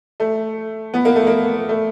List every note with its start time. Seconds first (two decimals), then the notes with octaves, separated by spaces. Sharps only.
0.20 A3
0.94 B3
1.05 A#3
1.16 A3
1.27 A#3
1.69 A3